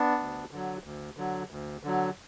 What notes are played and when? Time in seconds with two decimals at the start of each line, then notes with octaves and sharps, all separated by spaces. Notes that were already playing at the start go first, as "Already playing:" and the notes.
Already playing: B3 D4
0.19 D2
0.51 D3 F#3
0.84 D2
1.17 D3 F#3
1.51 D2
1.83 D3 F#3